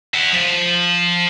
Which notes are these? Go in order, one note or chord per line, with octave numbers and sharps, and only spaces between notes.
E5 F#5
F3